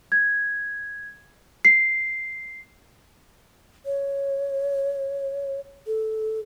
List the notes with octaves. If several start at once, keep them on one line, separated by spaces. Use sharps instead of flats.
G#6
C7
C#5
A4